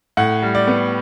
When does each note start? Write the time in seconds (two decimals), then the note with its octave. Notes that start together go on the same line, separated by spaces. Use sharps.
0.17 A2 F#5
0.42 G3
0.55 D5
0.67 B3